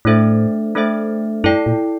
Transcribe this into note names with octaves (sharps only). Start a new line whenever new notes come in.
A2 A3 D4 A4 C5 E5
A3 D4 A4 C5 E5
G2 E4 A4 D5 G5
A#2